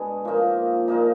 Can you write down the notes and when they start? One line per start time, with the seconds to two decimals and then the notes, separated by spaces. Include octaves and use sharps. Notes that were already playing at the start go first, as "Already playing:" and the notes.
Already playing: B2 G#3 D4 G#4 B4
0.25 A#2 F3 A#3 D#4
0.88 A#2 F3 A#3 D#4